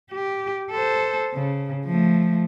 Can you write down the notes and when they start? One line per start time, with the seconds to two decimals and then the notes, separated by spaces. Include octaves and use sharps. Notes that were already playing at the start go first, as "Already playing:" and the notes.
0.11 G4
0.71 A4 C5
1.34 C#3
1.85 F3 A3